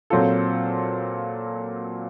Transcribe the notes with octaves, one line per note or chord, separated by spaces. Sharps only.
A#2 F#3 C4 F4 A4